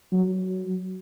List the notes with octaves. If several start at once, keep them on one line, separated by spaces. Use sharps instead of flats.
F#3